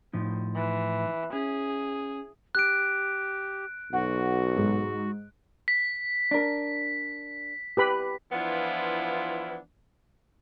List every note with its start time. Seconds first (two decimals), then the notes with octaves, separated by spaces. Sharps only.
0.13 A2 F3 D#4
0.55 E3
1.33 C#4 G#4
2.55 G4 F#6 D7
3.93 B1 F#4 F#5
4.56 G#2
5.68 B6
6.31 D4 A#4
7.77 G4 B4 B5
8.32 E3 F3 B3 D4 E4 F4